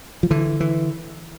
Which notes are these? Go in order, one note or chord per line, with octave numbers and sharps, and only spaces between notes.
F3
D3 E3
E3